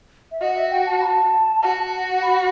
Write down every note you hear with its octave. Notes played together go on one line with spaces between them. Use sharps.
E5
F#4 D#5
E5
G5
A5
B5
A5
F#4
B5